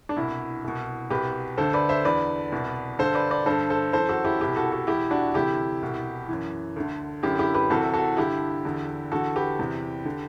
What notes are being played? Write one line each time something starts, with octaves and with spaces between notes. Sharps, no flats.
D4
C2 B2 E4
C2 B2
C2 B2 G4 B4
D2 D3 A4 C5
B4 D5
C5 E5
E2 D3 B4 D5
C2 B2
G2 D3 A4 C5
B4 D5
B4 D5
G2 D3 A4 C5
A4 C5
F#2 E3 A4 C5
F#4 A4
E4 G4
C2 B2 E4 G4
F#4 A4
F#4 A4
E2 B2 E4 G4
D4 F#4
D2 C3 E3 E4 G4
C2 B2
F#2 E3
D2 D3
F#2 D3 E4 G4
E4 G4
G4 B4
C2 C3 E3 F#4 A4
F#4 A4
G2 D3 E4 G4
E2 D3
E2 D3 F#4 A4
G4 B4
E2 C3 E3
D3